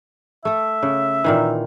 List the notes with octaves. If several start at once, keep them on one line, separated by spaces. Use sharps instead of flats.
A3 A4 E5
C#3
A#2 D#3 E3